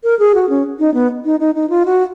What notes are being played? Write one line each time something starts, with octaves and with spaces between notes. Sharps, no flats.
A#4
G#4
F#4
C#4
D#4
B3
D#4
D#4
D#4
F4
F#4